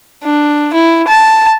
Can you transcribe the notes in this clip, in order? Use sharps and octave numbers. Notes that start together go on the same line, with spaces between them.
D4
E4
A5